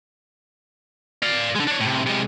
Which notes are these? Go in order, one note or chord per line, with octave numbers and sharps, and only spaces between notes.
D5 F5
D3 G#3
D4 C#5
A2 C3
C3 G#3